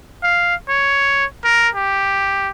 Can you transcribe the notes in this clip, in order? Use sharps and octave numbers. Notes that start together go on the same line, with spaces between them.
F5
C#5
A#4
G4